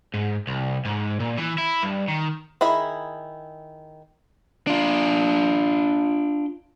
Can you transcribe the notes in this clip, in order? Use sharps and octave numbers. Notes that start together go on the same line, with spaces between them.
G#2
C2
G#2
A#2
E3
E4
G2
D#3
D#3 E4 G#4 B5
D4 F4